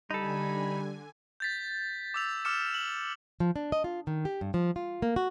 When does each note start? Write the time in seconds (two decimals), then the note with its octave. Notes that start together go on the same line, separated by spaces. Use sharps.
0.11 D3 G3 D#4 A4 G#5 B5
1.40 G6 A6 B6
2.14 D6 E6 F7
2.45 D6 E6 F6 C#7 E7
2.74 F#7
3.40 F3
3.56 D4
3.72 D#5
3.84 F4
4.07 D#3
4.25 G4
4.41 G2
4.54 F3
4.76 F4
5.02 A#3
5.16 F#4